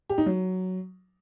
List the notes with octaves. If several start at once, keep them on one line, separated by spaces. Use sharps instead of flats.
G4
D#4
F#3